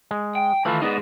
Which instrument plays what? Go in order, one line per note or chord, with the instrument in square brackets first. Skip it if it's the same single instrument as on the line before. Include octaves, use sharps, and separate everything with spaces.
[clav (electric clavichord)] G#3
[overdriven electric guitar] G5
[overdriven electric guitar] D#3 B5 [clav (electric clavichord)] E3 A3 F4
[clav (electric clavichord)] B3 D5 D#5 [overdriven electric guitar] D#4 G#4